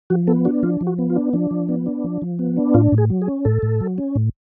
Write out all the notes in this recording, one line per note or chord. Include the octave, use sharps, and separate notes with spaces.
F3 F#4
B3 A4
D4 F#4
F3 F4
F3
F#4
B3
F4
D4
F3 D4
F3
B3
D4
F3
F3
B3
D4
A2 F4
A2
G#4
F#3
G#4
C#4
A2 A4
A2
F#3
C#4
A2